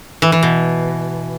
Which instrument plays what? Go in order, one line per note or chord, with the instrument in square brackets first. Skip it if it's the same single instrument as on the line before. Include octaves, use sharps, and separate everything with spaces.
[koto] E3
E3
B2